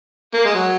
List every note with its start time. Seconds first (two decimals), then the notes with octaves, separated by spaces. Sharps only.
0.34 A#3
0.45 G#3
0.55 F#3